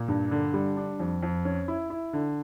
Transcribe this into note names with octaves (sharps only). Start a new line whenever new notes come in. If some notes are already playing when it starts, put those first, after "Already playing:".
Already playing: A#2
G2
D3
G3
D4
F2
F2
C#4
E4
E4
D3